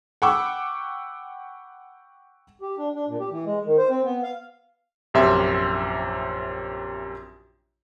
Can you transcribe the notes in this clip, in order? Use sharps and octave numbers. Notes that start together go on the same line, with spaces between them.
F#5 G5 B5 C#6 D6 E6
G4
D4
D4
A#2
G4
E3
G#3
D#3
C5
C4
B3
F5
A#1 F#2 C3 G4 E5 C6